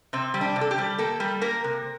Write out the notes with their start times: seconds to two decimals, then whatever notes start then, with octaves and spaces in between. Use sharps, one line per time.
0.13 C3 C4
0.34 G3
0.41 D4
0.56 C3
0.61 A4
0.71 G4
0.78 G3
0.98 A#3 A4
1.20 G3
1.41 A#3 A#4
1.64 C3